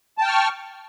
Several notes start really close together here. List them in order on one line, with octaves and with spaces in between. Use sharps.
A5 G5 F6 C#6